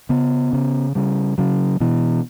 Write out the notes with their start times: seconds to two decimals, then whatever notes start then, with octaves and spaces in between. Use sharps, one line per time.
0.09 C#3 B3
0.53 C#3
0.95 C#3 G3
1.38 C#3 F#3
1.80 B2 E3